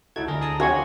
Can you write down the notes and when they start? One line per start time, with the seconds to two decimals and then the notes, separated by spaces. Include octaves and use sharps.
0.16 C#2 D#4 E4 F#4 A4 G#6
0.28 D2 E4 G#4 A#4 A#5
0.41 G#4 A5 D#6
0.60 F#4 G4 C#5 F#5 G#5 C6 G#6